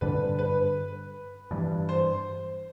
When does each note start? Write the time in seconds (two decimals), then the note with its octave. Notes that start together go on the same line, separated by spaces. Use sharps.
0.01 G2 D3 G3 D4 B4
0.39 B4
1.51 G2 E3 G3
1.89 C5